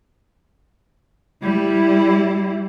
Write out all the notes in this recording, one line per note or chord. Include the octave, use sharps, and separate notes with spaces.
G3 E4